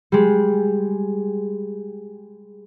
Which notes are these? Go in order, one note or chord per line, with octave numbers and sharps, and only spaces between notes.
G3 G#3